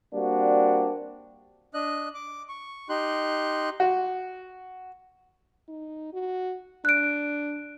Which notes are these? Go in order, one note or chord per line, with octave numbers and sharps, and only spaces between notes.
G3 A#3 C4 D4 F#4
D4 D#5 F#6
D6
C#6
D#4 G4 C6 F#6
F#4
D#4
F#4
D4 F#6 D7